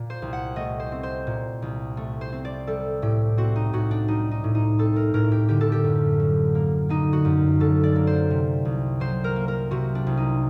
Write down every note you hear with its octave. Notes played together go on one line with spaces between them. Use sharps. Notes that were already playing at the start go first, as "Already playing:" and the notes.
Already playing: A#2
C5
C2
F#5
A3 D#5
C5
C4
C5
A#2
C2
A3
C5
C4
D5
G3 A4
A2 G4
C4 F#4
D#4
A2 F#4
D4
G3 D#4
D#4
A2
D#4
C4 A4
A#4
A2 A#4
G4
D3 G4
A4
G4
F#2
F#3
A#3
D3 D#4
F#4
F#2
F#3 A4
D5
A#3
C5
C3
C2
F#3 C5
A#4
A#3
A#4
C3 F#4
D4
C2
D#4